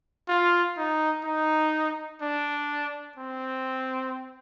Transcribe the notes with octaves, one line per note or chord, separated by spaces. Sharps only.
F4
D#4
D#4
D4
C4